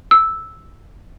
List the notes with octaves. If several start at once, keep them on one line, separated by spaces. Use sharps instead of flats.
E6